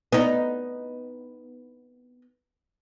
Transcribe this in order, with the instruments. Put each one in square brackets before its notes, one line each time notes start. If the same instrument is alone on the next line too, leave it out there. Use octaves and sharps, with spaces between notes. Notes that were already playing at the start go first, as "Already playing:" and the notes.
[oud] B3 D#4